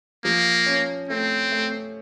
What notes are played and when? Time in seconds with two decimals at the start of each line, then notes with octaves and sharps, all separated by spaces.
0.25 F3 A#3
0.66 C#4
1.09 A3 C4
1.52 A3